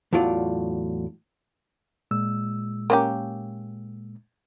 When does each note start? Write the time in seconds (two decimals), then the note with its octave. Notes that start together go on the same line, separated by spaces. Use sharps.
0.13 E2 A2 F#3 F4 D5
2.11 A#2 G#3 E6
2.90 A#3 C#4 G4